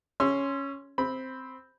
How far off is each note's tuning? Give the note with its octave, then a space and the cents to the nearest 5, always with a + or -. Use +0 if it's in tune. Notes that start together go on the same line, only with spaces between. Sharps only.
C#4 +0 C6 +0 E6 +40
C4 +0 B5 +0